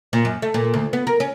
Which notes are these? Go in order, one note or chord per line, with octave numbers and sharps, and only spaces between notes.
A#2
F#2
A3
A#2
D2
B3
A#4
C#4